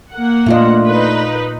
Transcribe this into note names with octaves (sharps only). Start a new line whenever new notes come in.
A#3 F#5
A#2 A3 D4 F4 D#5
D#4 B4